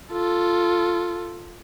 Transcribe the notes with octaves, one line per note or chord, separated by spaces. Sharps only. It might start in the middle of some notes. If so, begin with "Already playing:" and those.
F4 A4